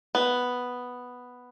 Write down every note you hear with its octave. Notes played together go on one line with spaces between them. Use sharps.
B3